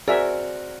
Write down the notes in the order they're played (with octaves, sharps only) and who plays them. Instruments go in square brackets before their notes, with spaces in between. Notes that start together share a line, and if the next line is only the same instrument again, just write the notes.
[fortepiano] C4 F#4 A#4 [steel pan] G#4 E5 [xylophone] D5